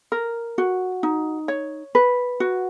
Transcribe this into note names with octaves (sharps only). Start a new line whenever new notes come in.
A#4
F#4
D#4
C#5
B4
F#4